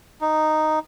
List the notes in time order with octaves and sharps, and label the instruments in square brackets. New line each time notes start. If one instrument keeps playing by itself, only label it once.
[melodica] D#4